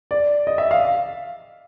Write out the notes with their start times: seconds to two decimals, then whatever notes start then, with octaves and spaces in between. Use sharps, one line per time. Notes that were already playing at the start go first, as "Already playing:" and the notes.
0.11 D5
0.47 D#5
0.58 E5
0.71 F5